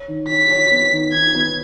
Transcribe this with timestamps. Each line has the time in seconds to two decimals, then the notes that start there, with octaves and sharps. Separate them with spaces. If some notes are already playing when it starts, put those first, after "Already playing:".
Already playing: C#5
0.08 D#3
0.29 C#5 B6
0.50 C#5
0.72 B3
0.92 D#3
1.13 D#3 G#6
1.35 B3